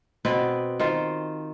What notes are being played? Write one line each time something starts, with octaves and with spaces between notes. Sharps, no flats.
B2 B3 C4 B4
D#3 F4 C5